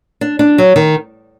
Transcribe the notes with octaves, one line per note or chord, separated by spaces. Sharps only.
D4
D4
F#3
D#3